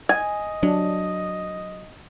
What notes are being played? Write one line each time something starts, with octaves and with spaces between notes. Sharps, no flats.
D#5 G#5
F#3 D4